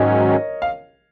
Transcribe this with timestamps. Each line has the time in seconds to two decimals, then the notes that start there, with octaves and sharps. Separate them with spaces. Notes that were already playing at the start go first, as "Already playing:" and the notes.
Already playing: G#2 D#3 F#3 C#4 A#4 C#5 D#5
0.62 F5